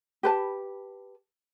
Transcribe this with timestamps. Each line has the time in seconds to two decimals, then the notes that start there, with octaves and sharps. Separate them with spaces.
0.23 G4 B4 A5